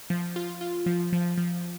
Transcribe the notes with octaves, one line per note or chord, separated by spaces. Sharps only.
F3
F4
F4
F3
F3
F3